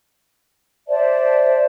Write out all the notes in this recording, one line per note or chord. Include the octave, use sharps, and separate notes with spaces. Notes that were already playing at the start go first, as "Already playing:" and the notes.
C5 D5 E5 A5